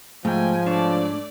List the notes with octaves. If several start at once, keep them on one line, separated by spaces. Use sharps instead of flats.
G#2 F3 A3 G5 G#5
A3 D4 C#5 D5 A5